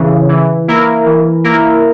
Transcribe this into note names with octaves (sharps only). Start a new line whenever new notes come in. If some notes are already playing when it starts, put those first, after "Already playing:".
Already playing: C#3 E3
E3
A#3 E4 A#4
E3
A#3 E4 A#4